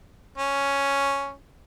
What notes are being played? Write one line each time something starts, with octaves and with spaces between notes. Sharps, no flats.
C#4